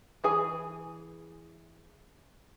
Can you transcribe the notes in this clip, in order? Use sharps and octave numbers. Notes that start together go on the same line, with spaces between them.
E3 G#4 G#5